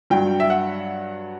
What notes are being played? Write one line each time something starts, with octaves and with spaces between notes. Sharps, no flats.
G2 F#3 G5
E5
F#5